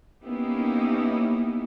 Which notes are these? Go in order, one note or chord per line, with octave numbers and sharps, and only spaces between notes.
A#3 B3 C#4 D#4 E4 G4